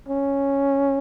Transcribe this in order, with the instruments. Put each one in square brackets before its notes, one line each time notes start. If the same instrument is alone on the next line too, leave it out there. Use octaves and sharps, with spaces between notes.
[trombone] C#4